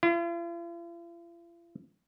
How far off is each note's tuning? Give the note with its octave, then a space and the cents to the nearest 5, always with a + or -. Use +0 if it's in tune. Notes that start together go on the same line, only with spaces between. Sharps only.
F4 -45